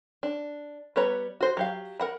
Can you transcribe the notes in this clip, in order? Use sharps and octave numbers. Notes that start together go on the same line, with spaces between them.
D4
G3 B3 B4 C#5 A#5
F#4 C5
F#3 G4 F5
A#4 F#5 B5